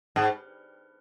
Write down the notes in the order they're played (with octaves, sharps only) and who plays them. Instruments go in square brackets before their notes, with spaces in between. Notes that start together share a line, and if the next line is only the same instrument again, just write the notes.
[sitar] G#2